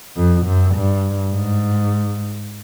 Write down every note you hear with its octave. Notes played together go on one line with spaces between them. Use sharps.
F2
F#2
G2
G#2